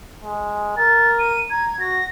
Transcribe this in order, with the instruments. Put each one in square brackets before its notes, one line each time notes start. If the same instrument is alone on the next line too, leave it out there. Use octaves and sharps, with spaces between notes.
[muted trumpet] G#3
[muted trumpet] A#4 [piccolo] A6
[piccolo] D#7
[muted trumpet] A#5 [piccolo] G#6
[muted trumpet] F#4 [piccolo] A#6